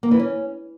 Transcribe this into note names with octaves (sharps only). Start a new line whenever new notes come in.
A#3
E3
C#4